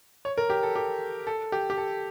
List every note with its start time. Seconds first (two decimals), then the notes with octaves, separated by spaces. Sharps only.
0.25 C#5
0.38 A#4
0.50 G4
0.63 A4
0.76 G4
1.27 A4
1.52 G4
1.70 G4
1.78 A4